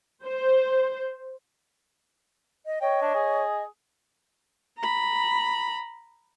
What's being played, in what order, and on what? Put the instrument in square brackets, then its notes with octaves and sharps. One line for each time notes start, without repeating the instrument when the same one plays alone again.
[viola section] C5
[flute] D#5
[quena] C#5 [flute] D#5 [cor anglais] G5
[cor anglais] D4
G#4
[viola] A#5 B5